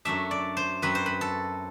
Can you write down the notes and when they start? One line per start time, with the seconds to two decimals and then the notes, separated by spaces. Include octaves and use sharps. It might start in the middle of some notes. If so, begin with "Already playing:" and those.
0.05 F#2 F#3 A3 D4 E5
0.31 D5
0.57 C5
0.82 F#2 F#3 C4 B4
0.95 C5
1.06 B4
1.21 A4